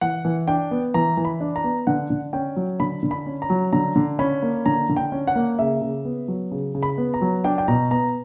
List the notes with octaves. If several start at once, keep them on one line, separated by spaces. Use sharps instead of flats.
E3 F#5
E3
D4 G5
B3
E3 A#5
E3
B5
D4
A#5
B3
D3 F#5
D3
C#4 G5
F#3
D3 B5
D3
B5
C#4
A#5
F#3
D3 A#5
D3
C#4 B5
A#3
D3 A#5
D3
G5
C#4
F#5
A#3
C#3 E5
C#3
B3
F#3
C#3
C#3
B5
B3
A#5
F#3
D4 G5
G5
B2 A#5
B3 A#5